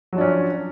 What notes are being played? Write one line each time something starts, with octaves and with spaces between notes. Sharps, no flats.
F3 F#3 C#4 D4